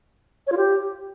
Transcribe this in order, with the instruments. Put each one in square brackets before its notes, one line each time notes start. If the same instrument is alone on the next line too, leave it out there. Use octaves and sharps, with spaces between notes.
[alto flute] C#5
F4
G4